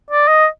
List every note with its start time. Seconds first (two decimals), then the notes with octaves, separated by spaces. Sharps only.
0.10 D5
0.28 D#5